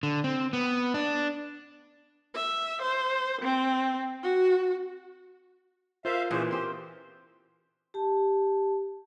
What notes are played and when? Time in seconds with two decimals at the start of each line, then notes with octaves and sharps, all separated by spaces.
0.03 D3
0.24 C4
0.53 B3
0.94 D4
2.35 E5
2.82 C5
3.41 C4
4.23 F#4
6.05 F4 A#4 C5 E5 F5
6.31 A#2 E3 C#4 G#4 C5
6.51 C4 G4 C5
7.94 G4 A5